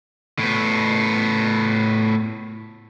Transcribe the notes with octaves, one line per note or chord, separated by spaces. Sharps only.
A2 B3